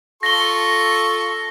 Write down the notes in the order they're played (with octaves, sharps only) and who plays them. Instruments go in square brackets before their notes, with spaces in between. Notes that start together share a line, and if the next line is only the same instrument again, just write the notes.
[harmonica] F4 A4 C#6 [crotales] A#6 G7